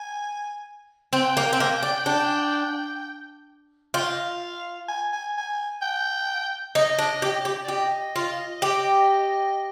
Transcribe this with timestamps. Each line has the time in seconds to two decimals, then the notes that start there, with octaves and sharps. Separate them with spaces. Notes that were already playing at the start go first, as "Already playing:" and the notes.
Already playing: G#5
1.13 C4 G5
1.37 A#3
1.53 C4
1.60 A#3
1.83 D4
2.06 D4
3.94 F4 G5
4.03 F5
4.12 D#5
4.21 F5
4.88 G#5
5.13 G#5
5.37 G#5
5.81 G5
6.75 D#4 D#5
6.99 D4
7.22 G4
7.45 G4
7.64 D5
7.68 G4 D#5
8.16 F4
8.62 G4